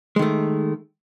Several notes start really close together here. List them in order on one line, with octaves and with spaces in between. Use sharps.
G#3 D#3 A3